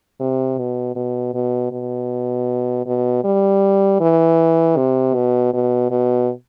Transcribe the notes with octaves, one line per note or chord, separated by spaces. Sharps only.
C3
B2
B2
B2
B2
B2
G3
E3
C3
B2
B2
B2